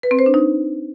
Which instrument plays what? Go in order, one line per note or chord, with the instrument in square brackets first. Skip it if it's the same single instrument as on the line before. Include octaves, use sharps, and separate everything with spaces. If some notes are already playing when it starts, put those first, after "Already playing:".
[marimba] B4
C4
C5
D4
D#4